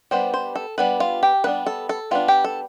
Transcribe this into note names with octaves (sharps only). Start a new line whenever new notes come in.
G3 B3 D4 C5
C5
A4
G3 B3 D4 B4
F4
G4
G3 B3 D4 B4
A4
A4
G3 B3 D4 F4
G4
A4